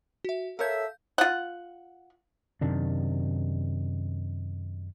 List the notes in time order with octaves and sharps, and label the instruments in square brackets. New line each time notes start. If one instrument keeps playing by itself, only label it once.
[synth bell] F#4 E5
[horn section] A4 E5 [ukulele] A#4 C#5 [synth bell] F5 G6
[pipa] F4 F#5
[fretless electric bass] F#2 C3 D#3 D4